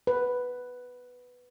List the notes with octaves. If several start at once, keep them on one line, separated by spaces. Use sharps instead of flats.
B4